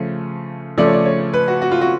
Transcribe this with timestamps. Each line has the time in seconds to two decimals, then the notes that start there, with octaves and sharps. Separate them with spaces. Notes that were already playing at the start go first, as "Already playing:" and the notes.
Already playing: C#3 F3 A3
0.78 C#3 F3 A3 D5
0.86 C#5
0.93 D5
1.05 C#5
1.34 B4
1.48 F#4
1.62 F#4
1.72 F4
1.81 F#4